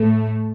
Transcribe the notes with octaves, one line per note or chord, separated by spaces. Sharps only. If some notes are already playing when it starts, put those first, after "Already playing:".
Already playing: A2 A3